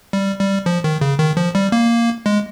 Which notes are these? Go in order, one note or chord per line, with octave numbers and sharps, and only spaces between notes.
G3
G3
F3
D#3
C#3
D#3
F3
G3
A#3
G#3